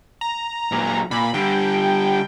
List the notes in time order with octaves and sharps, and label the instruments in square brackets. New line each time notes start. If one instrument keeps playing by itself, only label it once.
[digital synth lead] A#5
[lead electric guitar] A#2 F#3
[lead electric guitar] A#2 [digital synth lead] B5
[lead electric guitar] D3 G3 [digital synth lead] G5